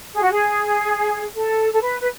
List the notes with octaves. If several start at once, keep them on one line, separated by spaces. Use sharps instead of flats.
G#4
F#4
G#4
A4
A4
B4
B4